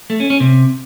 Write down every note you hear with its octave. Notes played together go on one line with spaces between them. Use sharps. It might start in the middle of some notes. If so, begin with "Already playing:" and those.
A3
C#4
C#4
C3